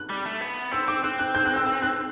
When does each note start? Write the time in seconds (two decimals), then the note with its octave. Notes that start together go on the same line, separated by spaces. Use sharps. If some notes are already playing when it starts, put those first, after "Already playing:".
Already playing: F#6
0.10 G3
0.25 A3
0.41 B3
0.71 C4 E6
0.87 C4 D6
1.03 C4 F#6
1.19 F#6
1.35 G6
1.46 F#6
1.56 E6
1.67 E6
1.82 F#6